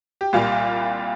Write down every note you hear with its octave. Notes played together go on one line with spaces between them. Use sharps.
G4
C2 A#2 G3 F4